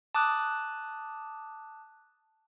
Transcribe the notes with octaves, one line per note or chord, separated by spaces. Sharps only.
A5 D6 D#6 F#6